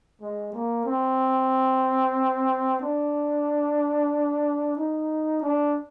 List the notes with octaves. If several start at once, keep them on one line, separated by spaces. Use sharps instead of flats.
G#3
A#3
C4
D4
D#4
D4